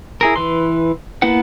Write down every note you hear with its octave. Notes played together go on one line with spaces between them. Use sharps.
E4 G#4 A#4
E3 B4 C6
A#3 B3 E4 B4 F#5